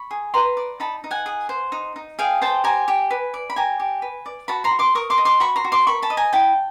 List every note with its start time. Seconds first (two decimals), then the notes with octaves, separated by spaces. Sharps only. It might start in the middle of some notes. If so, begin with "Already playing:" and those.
Already playing: B5 C#6
0.11 G#4
0.34 B4 A#5 C6
0.57 D5
0.80 D#4 A5 B5
1.04 D#4
1.11 F#5 G#5
1.26 G#4
1.49 C5
1.72 D#4
1.96 D#4
2.19 G#4 F5 G5
2.42 C5 G5 A5
2.64 G4 G#5 A#5
2.88 G4
3.11 B4
3.34 D5
3.50 B5
3.56 G4 G#5 A#5
3.80 G4
4.02 B4
4.26 D5
4.48 F#4 A5 B5
4.64 A#5 C6
4.71 F#4
4.79 C6 D6
4.95 A#4 C#6 D#6
5.10 C6 D6
5.18 D#5
5.25 C6 D6
5.40 F#4 B5 C#6
5.56 A#5 C6
5.65 F#4
5.72 C6 D6
5.87 A#4 B5 C#6
6.02 A5 B5
6.10 D#5
6.17 G#5 A#5
6.33 E4 G5 A5